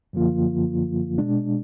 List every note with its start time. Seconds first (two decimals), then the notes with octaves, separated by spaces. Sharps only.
0.13 F#2 D3 F3 A#3 F4
1.18 B2 G#3 D4